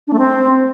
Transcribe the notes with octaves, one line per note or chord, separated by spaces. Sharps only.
D4
A3
C4